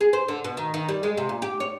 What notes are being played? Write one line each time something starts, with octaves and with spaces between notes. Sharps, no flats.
G#4
C5
D3
B2
D#3
D#3
G3
G#3
C3
A#2
G4
C#5